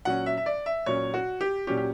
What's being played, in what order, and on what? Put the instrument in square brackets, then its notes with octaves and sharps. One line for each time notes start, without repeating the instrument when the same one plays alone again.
[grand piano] A#2 F#3 C#4 F#5
E5
E5
D5
E5
A#2 F#3 C#4 C#5
F#4
G4
A#2 F#3 C#4 G4
G4